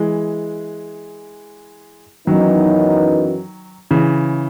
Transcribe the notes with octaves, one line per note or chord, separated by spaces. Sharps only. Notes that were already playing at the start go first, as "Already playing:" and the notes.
Already playing: E3 G#3
F#2 D#3 E3 F#3 B3 D#4
C#3 E3